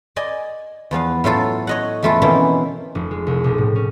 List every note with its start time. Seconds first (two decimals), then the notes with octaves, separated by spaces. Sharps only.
0.16 D5 D#5 G#5
0.91 E2 F3 B3 F5
1.24 A2 F#3 F4 A4
1.67 C#5 D#5 F#5
2.03 E2 F3 A3 E4 F4
2.22 B2 D#3 E3 A#3 C4 C#4
2.95 F1
3.11 G#3
3.27 C2
3.44 B1
3.58 A2
3.75 C#4